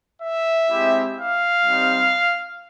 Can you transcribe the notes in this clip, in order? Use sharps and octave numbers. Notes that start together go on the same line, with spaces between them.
E5
G#3 C4 E4 G4
F5
G3 C4 D#4